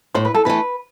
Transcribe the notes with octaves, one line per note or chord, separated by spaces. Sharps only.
A2 C5
B4
A4
E3 A3 B4